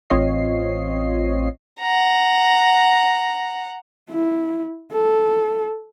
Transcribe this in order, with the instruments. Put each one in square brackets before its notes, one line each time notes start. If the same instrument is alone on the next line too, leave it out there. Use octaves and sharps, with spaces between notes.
[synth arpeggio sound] A1 C4 F4 C#5 D#5 C7
[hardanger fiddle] F#5 A#5
[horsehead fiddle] E4
A4